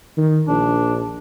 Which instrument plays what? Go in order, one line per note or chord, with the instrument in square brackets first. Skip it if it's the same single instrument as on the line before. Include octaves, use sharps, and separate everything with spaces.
[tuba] D#3
[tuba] A#1 [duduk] D4